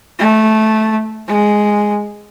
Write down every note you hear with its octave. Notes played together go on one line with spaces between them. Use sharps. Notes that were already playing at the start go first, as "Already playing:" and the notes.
A3
G#3